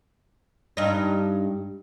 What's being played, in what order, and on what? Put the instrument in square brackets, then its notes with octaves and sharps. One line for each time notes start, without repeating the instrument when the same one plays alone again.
[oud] G2 D#4